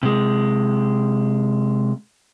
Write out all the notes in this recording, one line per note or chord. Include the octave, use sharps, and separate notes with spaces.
C3 G#3